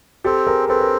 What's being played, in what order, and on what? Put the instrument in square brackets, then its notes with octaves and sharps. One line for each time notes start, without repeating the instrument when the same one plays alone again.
[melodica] C4 [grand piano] G4 A4
[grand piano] G#4 A#4
[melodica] C4 [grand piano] A4 B4
[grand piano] A#4